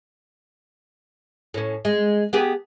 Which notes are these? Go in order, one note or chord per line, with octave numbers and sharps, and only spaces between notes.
A2 C#4
G#3
B3 G4 G#4